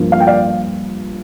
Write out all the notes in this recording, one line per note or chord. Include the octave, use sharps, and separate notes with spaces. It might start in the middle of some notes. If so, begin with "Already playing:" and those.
Already playing: G2 F3 A#3
F5
G5
D5 F5